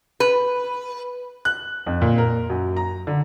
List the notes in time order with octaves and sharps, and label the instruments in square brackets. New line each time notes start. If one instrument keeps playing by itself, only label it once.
[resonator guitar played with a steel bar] B4
[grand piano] F#6
F2
A#2
A#4
F#2
A#5
D3